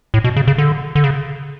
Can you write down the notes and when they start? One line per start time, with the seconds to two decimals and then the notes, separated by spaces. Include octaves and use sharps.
0.14 A2
0.24 B2
0.36 C#3
0.47 C#3
0.58 D3
0.95 D3
1.04 C#3